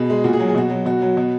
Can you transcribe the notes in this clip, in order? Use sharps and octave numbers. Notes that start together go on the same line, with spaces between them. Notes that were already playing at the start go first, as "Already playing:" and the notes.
Already playing: B2 G#4
G#3
A#2 F#4
G#4
F#3 F#4
G#4
B2 F#4
F#3
B2 F#4
F#3
B2